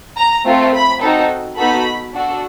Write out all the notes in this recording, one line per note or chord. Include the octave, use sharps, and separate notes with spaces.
A#5
A3 C4 F4 A4
B5
C4 D#4 F#4 A4
B3 D#4 F#4 A4 B5
D4 F#4 A4